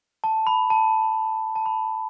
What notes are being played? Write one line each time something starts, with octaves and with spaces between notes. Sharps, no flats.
A5
B5
A5
A5
B5